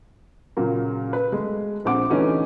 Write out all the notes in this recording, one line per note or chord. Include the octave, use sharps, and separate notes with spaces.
A#2 C#3 F#3 A#3
B4
G#3 A3
A#1 C4 F#5 D6
D3 E3 A3 C#4 D#4 F#4